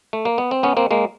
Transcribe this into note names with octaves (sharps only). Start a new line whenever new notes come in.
A3
A#3
B3
C4
B3 C#4
A#3 C4
G#3 A#3